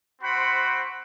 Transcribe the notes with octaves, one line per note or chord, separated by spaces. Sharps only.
C4 F#4 C5 F#5 B5